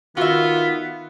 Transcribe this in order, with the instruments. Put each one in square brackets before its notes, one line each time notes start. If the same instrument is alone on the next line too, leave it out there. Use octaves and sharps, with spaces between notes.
[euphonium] D#3 [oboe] B3 [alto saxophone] F4 [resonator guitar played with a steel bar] F#4 E5